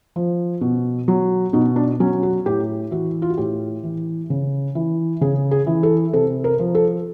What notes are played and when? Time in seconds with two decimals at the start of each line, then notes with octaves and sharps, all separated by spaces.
0.16 F3
0.61 B2
1.08 F#3
1.53 B2 D#4
1.76 D4
2.00 F#3 C#4
2.23 F#4
2.46 A2 G4
2.91 E3 F#4
3.22 F4
3.30 F#4
3.38 A2 G4
3.83 E3
4.30 C#3
4.75 E3
5.21 C#3 G#4
5.51 G#4
5.67 E3
5.83 A4
6.13 C3 A4
6.44 A#4
6.59 F3
6.75 A4